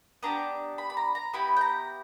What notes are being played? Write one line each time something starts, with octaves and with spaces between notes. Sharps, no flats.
B3 D4 G4 A#5
B5
B5
A#5
A#5
B3 E4 G4 B5
G5
A#5